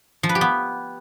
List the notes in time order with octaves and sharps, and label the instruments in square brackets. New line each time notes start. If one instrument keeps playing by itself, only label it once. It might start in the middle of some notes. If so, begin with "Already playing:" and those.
[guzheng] F3
B4
G4
B3